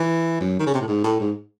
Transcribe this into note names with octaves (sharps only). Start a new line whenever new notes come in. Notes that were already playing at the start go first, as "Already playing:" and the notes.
Already playing: E3
F#2
D#3
C#3
C3
A2
G#2
A2
G#2